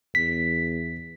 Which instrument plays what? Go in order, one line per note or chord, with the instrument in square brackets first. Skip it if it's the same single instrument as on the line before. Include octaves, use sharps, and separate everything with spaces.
[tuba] E2 [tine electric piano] B6